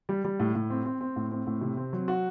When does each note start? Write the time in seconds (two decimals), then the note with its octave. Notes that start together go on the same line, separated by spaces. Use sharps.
0.09 G3
0.24 G3
0.40 A2
0.55 A2
0.70 C4
0.86 C4
1.01 C4
1.16 A2
1.32 C4
1.47 A2
1.61 C3
1.77 C4
1.93 F#3
2.08 F#4